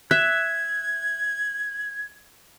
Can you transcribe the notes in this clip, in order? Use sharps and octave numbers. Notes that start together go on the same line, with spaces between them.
E5 F#6 G#6